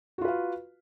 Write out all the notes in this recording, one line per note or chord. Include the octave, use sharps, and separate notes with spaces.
F4 F#4 B4 F5